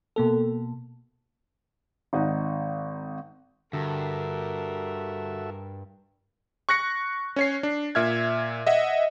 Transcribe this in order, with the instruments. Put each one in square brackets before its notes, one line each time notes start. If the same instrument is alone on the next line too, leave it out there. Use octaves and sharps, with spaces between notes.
[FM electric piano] B2 A#3 A4
[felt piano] G#1 D#4 F#5
[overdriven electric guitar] G2 [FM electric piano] D3 [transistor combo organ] F#4 A4 E5 [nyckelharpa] A#4
[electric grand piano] C#6 F#6 A#6 C#7
C#4 C#5 C7
D4
A#2 E5 F6 G#6
D#5 E5 F#5